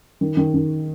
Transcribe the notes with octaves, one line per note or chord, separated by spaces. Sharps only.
D#3
D#3
D#3